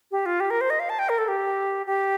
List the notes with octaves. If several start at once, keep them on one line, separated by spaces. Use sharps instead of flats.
G4
F4
G4
A#4
C5
D#5
F5
A5
G5
A#4
A4
G4
G4